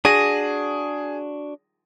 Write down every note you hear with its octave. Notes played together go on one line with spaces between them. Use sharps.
D4 F#4 G#4 A#6 D#7